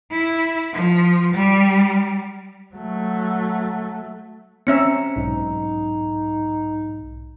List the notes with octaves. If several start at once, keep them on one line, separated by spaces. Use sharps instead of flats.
E4
F3
G3
F#3 A3
C4 C#4 E5 A#5 C#7
B1 G#2 D#4